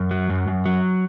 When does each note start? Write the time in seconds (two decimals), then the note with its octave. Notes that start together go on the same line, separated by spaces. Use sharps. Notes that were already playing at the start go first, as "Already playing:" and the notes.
Already playing: F#2
0.11 F#3
0.30 F#2
0.47 F#2
0.66 F#3